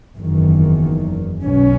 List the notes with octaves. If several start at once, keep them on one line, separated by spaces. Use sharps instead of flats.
F#1 E2 D#3
B1 B2 F#3 C#4